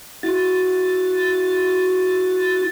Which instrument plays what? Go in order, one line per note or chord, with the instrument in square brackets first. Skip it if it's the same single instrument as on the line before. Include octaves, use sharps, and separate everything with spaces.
[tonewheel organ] E4 F#4 A6